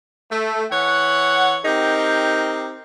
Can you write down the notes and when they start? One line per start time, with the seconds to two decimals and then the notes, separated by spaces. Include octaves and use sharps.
0.31 A3
0.71 E3 C#5 F#5
1.64 C4 D#4 G4 A#4